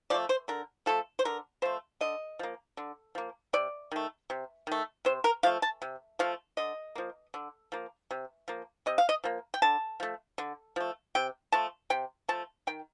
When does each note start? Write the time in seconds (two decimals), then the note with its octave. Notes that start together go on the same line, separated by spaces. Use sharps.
0.10 F3 A3 D5
0.29 C5
0.48 D3 A#4
0.86 F3 A3 A4
1.19 C5
1.25 D3 A#4
1.62 F3 A3 C5
2.01 D3 D#5
2.39 F3 A#3
2.77 D3
3.15 F3 A#3
3.53 C3 D5
3.92 D#3 A3
4.30 C3
4.67 D#3 A3
5.05 C3 C5
5.24 A#4
5.43 F3 A3 F5
5.62 A5
5.82 C3
6.19 F3 A3 F5
6.57 D3 D#5
6.95 F3 A#3
7.34 D3
7.72 F3 A#3
8.11 C3
8.48 F3 A#3
8.86 C3 D#5
8.98 F5
9.09 D#5
9.24 F3 A#3
9.54 G5
9.62 D3 A5
10.00 F3 A3
10.38 D3
10.76 F3 A3
11.15 C3 G5
11.52 F3 A3 A5
11.90 C3 G5
12.28 F3 A3 A5
12.67 D#3 G5